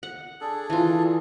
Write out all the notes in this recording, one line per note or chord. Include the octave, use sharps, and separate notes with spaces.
F#5
D4 G#4 A4
E3 F4